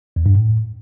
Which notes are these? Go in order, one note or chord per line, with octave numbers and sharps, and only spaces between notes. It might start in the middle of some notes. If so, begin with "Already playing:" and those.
E2
G2
A2